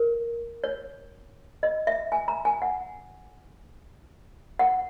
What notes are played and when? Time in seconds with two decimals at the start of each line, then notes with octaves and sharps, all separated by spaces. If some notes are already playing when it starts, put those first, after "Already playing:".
Already playing: A#4
0.64 C#5
1.63 D#5
1.87 E5
2.12 G#5
2.28 A#5
2.45 G#5
2.62 F#5
4.59 F#5